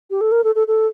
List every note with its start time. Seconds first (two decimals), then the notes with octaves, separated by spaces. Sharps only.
0.11 G4
0.21 A4
0.32 A#4
0.44 A4
0.55 A4
0.68 A4